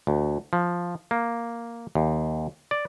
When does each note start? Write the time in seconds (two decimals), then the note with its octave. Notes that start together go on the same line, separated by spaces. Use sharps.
0.07 D2
0.53 F3
1.11 A#3
1.95 D#2
2.71 D5